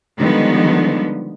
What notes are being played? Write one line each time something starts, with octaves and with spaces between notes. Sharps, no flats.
D3 D#3 F3 G3 G#3 B3